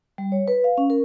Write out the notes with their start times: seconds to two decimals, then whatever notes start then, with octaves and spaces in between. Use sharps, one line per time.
0.18 G3
0.32 C#5
0.48 B4
0.64 F5
0.78 C#4
0.90 A#4